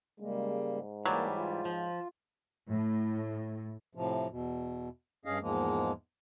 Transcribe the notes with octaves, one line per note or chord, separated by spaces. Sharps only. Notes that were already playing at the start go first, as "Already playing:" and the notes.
C#3 G3 G#3 A#3
G#2
E3 F#3 G3 A#3 D4
F4
F3
A2
A2 C3 F3
E2 B2
G2 C#4 G#4 D#5 F5
E2 G#2 F3 G#3 A#3